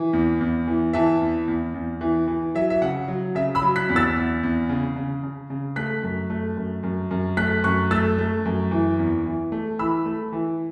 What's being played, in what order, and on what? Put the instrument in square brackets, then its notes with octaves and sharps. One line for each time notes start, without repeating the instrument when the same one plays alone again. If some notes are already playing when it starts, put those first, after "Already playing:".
Already playing: [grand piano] E3
E2
E2
E3
E3 E5 A5
E2
E2
E2
E3
E3
F#3 E5
E5
C#3 F#5
F#3
C#3 E5
B5 E6
F#3
F#6 B6
E2
E6 A6
E2
E2
C#3
C#3
C#3
C#3
A3 F#6 B6
F#2
A3
F#2
F#2
F#2
A3 F#6 B6
F#2 C#6 F#6
A3 E6 A6
A3
F#2
E3
E2
E3
A3
E3 B5 E6
A3
E3